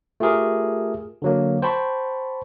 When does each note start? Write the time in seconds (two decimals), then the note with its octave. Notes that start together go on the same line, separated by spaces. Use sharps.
0.20 A3 F4 G4 G#4 A#4
1.22 D3 F#3 A#3
1.62 C5 G5 A5 B5 C#6